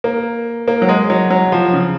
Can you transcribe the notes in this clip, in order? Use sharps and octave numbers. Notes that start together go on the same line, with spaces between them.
A#3
A#3
F#3
G#3
F#3
F#3
F3
C#3